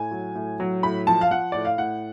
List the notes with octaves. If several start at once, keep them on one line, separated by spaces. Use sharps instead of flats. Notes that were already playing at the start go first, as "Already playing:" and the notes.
Already playing: A2 G#5
F#3
A2
F#3
A2 B5
F3 A5
F5
F3 F#5
A2 D5
F5
A2 F#5